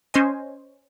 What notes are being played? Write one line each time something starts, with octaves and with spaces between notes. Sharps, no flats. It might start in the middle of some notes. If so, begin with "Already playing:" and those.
C#4 C5 D#5 G#5